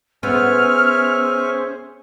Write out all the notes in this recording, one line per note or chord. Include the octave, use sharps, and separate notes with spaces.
B3 C#4 G#4 C5 E5 G#5 C#6 F6